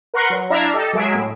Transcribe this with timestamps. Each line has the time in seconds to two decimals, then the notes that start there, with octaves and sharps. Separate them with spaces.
0.14 A#4 B4 F#5 A#5 C6 C#6
0.30 F#3
0.50 D4 E4 D5 E5 F5 A#5
0.74 G4 A4 D#5
0.93 F#3 G#3 G#4 E5 D7
1.14 A2